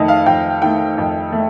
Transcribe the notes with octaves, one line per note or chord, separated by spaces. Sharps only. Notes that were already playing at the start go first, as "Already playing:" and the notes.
Already playing: F2 D#3 A3 D#5
F5
F2 G5
D#3 A3 G5
F2
A3